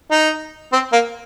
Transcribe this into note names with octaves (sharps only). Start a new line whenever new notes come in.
D#4
C4
A#3